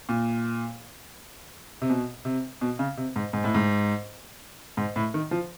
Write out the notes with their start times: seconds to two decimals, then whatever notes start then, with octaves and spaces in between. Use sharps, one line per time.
0.09 A#2
1.82 C3
1.90 B2
2.25 C3
2.61 B2
2.79 C#3
2.97 C3
3.16 G#2
3.33 G#2
3.44 A2
3.55 G#2
4.77 G#2
4.96 A2
5.14 D#3
5.31 F3